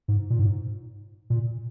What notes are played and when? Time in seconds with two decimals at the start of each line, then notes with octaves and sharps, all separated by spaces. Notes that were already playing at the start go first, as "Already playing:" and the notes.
0.08 G#2
0.30 A#2
0.39 G#2
1.30 A#2